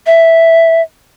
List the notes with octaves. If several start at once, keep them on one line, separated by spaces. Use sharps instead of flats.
E5